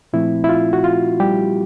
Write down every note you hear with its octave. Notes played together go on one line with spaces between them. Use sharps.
A#2 F3 A3 C4 E4
E4
F4
F#4
F4
G3 G4